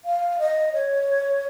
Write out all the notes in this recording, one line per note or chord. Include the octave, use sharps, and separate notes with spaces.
F5
D#5
C#5